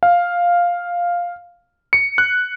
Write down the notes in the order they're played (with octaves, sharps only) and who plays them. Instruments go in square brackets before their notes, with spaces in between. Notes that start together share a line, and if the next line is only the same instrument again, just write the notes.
[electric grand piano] F5
C#7
F#6